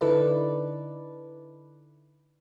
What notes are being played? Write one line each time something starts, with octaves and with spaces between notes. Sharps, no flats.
D3 D#4 E4 A4 B4 D5